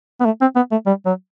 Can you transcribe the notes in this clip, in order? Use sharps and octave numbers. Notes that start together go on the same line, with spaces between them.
B3
A3
C4
B3
A3
G3
F#3